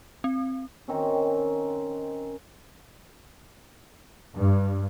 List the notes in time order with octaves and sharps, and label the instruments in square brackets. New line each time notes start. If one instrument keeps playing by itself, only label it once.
[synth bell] C4
[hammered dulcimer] D#3 C4 C#4
[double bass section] G2